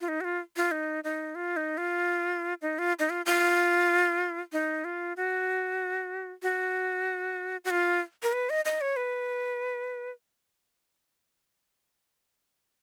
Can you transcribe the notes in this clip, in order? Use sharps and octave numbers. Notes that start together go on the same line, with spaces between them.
F4
D#4
F#4
F4
F4
D#4
D#4
F4
D#4
F4
D#4
F4
D#4
F4
F4
D#4
F4
F#4
F#4
F#4
F4
A#4
B4
D#5
D#5
C#5
B4